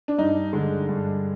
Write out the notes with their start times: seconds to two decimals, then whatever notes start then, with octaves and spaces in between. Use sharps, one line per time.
0.08 D4
0.18 G2 D#4
0.53 D3 G#3 D4
0.89 G2